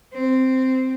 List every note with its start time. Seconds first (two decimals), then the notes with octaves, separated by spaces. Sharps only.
0.14 C4